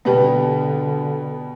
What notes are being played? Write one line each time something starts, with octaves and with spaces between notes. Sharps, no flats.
B2 D3 G3 B3